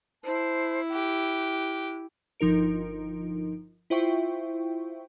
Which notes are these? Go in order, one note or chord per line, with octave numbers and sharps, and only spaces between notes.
E4 C5 A5
G4 F#6
G1 F3 D#4 A#4 D7
E4 F4 C5 E5 G5 C#6